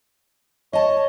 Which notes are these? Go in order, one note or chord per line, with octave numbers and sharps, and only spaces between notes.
C#5 D#5 A5